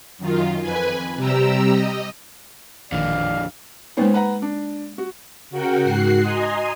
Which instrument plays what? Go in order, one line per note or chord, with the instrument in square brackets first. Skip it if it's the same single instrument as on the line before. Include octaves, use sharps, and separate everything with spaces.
[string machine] F#2 D#3 F4
F2 B4 G#5
C3 G3 G4 A#5 E6
D#5
[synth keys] A1 A#2 D#3 [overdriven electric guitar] F2 D3 [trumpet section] D5 F5
[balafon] G#3 A#3 D#4 [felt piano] B3 C#4 C5
[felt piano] B4 F#5 A#5
D4
F#4
[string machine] C#3 F#4 A#4 F#5 G5
G#2 F#4 F#6 C7
D#5 G#5 A#5 C6 D#6